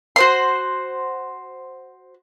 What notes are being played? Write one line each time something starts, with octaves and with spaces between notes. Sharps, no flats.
F#4 C5 C6